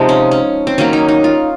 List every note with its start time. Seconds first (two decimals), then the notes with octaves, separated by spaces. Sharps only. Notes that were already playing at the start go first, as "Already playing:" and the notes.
Already playing: C3 F3 G#3 D#4
0.09 C#4
0.31 C#4
0.67 C4
0.78 D#3 F#3 A#3 C#4
0.93 D#4
1.08 D#4
1.24 F4